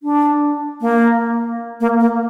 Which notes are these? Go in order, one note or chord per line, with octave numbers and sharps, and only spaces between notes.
D4
A#3
A#3
A#3